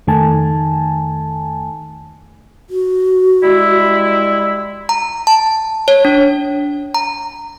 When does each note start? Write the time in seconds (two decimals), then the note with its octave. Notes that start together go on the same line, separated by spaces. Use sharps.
0.07 F2 D#3 A3 G#5 A5
2.70 F#4
3.43 G3 G#3 E4
4.89 A#5
5.27 A5
5.88 C#5
6.05 D4
6.94 A#5